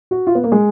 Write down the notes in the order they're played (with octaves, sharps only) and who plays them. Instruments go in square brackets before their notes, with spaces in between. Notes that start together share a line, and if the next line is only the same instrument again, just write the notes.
[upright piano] F#4
F4
B3
A#3
G#3